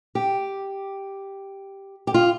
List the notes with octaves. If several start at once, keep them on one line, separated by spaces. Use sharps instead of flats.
G4
G4
F4